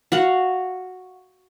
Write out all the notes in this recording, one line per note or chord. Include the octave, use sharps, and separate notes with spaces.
F#4 F5 F#5